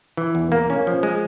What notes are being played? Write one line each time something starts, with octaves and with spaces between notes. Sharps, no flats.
E3
E2
A#3
C#4
F3
G#3